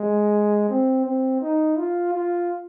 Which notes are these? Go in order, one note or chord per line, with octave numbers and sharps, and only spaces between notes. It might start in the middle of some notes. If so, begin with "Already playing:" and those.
Already playing: G#3
C4
C4
D#4
F4
F4